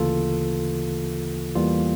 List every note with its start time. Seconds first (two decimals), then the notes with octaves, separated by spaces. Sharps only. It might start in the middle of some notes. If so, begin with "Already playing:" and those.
Already playing: D2 C#3 E3 A#3 F4 A4
1.55 E2 E3 G3 A#3 F4